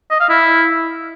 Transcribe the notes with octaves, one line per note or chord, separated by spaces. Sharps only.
D#5
F5
E4